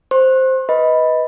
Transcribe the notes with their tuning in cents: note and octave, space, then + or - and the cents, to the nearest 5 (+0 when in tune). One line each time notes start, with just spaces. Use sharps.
C5 +0 C6 +45
B4 +0 D#5 +20 B5 +0